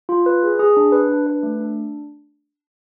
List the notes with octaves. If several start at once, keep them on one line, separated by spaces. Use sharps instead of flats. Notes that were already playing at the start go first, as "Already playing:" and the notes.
F4
B4
G#4
G#4
D4
B4
D4
B4
A3
D4